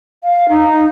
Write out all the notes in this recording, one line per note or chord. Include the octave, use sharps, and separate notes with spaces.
F5
D#4